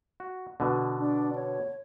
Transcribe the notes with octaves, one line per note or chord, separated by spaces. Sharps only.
F#4
B2 D3
D4
C#5